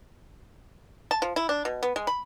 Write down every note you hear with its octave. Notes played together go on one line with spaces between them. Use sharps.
A5
F3
E4
D4
B2
B3
G#3
B5